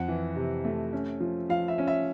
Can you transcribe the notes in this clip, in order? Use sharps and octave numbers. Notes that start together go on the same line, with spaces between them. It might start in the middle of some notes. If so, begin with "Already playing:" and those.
Already playing: F2 F#5
E3
C3
A3
C#4
F3
F3 F5
E5
C#4
E5